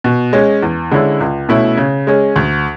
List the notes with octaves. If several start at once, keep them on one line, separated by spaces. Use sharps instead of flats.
B2
G#3 C#4
E2
D3 G#3 C#4 E4
C#2
B2 A3 C#4 E4
C#3
G#3 C#4 G#4
D2